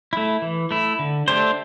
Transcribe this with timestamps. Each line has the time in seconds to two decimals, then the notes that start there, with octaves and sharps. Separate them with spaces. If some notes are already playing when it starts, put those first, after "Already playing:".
0.13 A3 E4
0.42 E3
0.71 A3 E4
0.99 D3
1.28 A3 D4 G4 C5